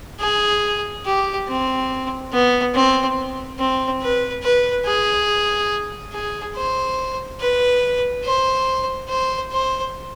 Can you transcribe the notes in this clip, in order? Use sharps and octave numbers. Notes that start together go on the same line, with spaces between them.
G#4
G4
C4
B3
C4
C4
B4
B4
G#4
G#4
C5
B4
C5
C5
C5